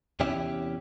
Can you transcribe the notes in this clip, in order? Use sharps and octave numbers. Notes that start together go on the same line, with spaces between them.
E2 C3 C#4 E4 G4 E5